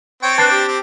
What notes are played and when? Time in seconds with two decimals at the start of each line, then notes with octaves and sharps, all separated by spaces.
0.23 C4 C#5 G5
0.38 D4 B4 A5 A6 C7
0.51 G4
0.68 C4